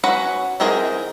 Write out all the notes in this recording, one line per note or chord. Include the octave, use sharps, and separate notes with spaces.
C#4 F#4 B4 F#5 A#5
E3 C4 D#4 G#4 A#4